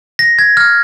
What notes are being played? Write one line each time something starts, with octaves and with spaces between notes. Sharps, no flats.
A#6
G#6
F6